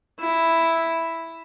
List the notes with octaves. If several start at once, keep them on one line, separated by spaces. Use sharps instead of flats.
E4